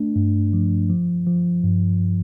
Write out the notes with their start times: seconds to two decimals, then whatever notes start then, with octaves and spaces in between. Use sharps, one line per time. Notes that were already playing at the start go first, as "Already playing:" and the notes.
Already playing: A3 D4
0.16 G2
0.53 F3
0.90 F3
1.27 F3
1.64 G2